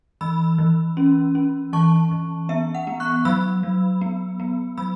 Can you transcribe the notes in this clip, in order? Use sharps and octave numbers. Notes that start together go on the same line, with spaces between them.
E3 B5 E6
E3
C#4
C#4
E3 A5 C#6
E3
B3 E5
F#5
B3
C#6 F#6
F#3 B5 E6
F#3
B3
B3
F#3 B5 E6